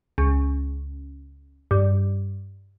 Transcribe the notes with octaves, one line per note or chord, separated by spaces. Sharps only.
C#2
G2